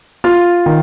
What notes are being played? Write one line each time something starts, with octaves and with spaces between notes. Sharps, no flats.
F4
D#3